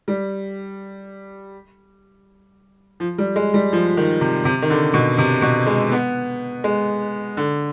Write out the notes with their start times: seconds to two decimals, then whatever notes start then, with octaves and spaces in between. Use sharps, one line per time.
0.08 G3
3.00 F3
3.18 G3
3.36 G#3
3.54 G3
3.73 F3
3.97 D#3
4.21 C3
4.45 C3
4.62 D#3
4.70 D3
4.94 B2
5.18 C3
5.42 B2
5.67 G#3
5.92 B3
6.64 G#3
7.37 D3